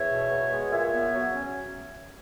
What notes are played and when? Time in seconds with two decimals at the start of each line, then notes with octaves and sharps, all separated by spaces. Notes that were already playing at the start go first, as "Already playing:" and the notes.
Already playing: E2 C#5 E5
0.10 B2
0.32 B3
0.52 G#3
0.71 A#2 C#5 E5
0.92 B3
1.12 F#3
1.34 C#4